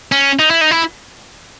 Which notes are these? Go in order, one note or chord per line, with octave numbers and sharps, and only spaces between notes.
C#4
D#4
E4
D#4
E4